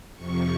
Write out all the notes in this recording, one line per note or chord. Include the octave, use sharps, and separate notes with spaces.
F2 C3 F3 C#6